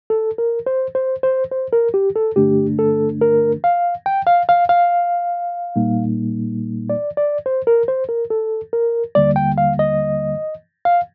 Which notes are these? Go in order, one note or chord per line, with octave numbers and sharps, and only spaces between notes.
A4
A#4
C5
C5
C5
C5
A#4
G4
A4
G2 D3 A3 D4 G4
A4
A#4
F5
G5
F5
F5
F5
A#2 G3 A#3 D#4
D5
D5
C5
A#4
C5
A#4
A4
A#4
D#2 D3 G3 A#3 D5
G5
F5
D#5
F5